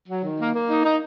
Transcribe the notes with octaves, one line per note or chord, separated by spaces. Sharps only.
F#3
D#3
A#3
A#3
D#4
D#4